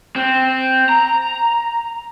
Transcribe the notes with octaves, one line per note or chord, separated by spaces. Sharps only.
C4
A#5